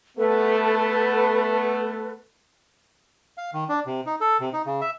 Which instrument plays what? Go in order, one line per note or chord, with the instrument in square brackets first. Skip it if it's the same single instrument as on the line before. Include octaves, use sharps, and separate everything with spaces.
[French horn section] A3 B3 [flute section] A4 B4
[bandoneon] F5
D#3
D4
C3
D#4
A4
C3
D#4
C#3
E5